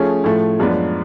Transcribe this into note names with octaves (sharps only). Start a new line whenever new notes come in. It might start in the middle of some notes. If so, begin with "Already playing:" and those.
Already playing: F3 A3 C#4 G#4
A2 F3 A3
F#2 F3 G#3 B3 D4